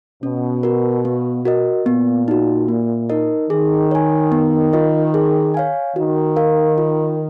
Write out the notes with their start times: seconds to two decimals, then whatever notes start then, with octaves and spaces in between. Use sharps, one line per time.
0.23 B2 C#4
0.63 F#4 A#4
1.05 B3
1.45 F#4 A#4 D#5
1.86 A#2 B3
2.28 D#4 F#4
2.68 A#3
3.10 D#4 A#4 D#5
3.50 D#3 G#4
3.91 C#5 G#5
4.32 B3
4.73 F4 A#4 D#5
5.14 G#4
5.54 C#5 F5 G#5
5.96 D#3 F#4
6.36 A#4 F5
6.78 F4